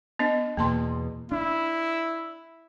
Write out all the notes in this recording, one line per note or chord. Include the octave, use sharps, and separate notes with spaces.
B3 D4 D#5
E2 B2 A#3 A5 C6
D4 E4